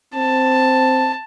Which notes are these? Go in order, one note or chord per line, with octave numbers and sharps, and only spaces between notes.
C4 A5